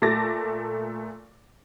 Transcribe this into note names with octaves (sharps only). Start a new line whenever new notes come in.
A#2 A3 A5 D6 A6 A#6